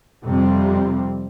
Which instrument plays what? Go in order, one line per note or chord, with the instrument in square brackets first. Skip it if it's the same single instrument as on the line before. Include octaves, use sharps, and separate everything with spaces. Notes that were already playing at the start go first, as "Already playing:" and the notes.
[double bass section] F2 C3 G3 C4